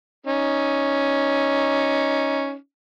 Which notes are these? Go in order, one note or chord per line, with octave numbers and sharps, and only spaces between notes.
C#4 D#4